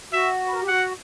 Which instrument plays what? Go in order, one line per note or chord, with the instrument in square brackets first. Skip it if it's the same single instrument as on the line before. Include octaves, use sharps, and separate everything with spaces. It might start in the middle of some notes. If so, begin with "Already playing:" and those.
[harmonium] F#4 [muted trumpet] E5
[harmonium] B4
A#4
G4
[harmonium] F#4 [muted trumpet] F#5